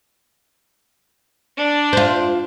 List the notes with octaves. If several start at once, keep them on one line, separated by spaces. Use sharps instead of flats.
D4 D5
F4 C5